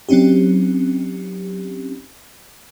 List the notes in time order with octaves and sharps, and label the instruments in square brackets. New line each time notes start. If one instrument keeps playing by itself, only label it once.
[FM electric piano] F#3 C4 C#4 D#4 G4